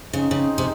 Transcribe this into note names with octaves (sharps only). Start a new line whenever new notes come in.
C#3 C4 D#4 G#4
C#3
C3